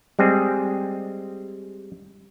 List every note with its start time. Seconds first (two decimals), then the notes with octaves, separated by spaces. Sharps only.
0.19 G3 G#3 C4 G#4